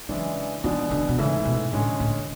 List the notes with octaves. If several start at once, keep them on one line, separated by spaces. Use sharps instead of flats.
C#3 E3 F#3 G#3 D4
B2 E3 G#3 D4
D3
B2
G#2 C#3 E3 A3 E4
B2
A2 D3 G#3 C#4
A2